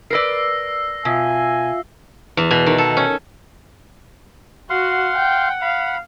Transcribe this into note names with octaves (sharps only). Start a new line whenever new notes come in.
A#4 B4 D5 E6 A#6 C7
B2 F4 E5 F5 G#5
E2
B2
D#3
A4
C#4
F#4 F5 F#5 C6
G5
F5 B5